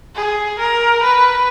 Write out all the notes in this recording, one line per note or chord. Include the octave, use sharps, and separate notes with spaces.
G#4
A#4
B4